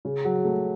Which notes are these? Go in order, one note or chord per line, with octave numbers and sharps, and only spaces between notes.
C#3
F#3
A3